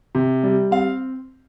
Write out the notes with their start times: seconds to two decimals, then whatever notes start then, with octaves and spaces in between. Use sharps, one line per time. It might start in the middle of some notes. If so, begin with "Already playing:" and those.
0.15 C3
0.44 G3
0.71 C4 F5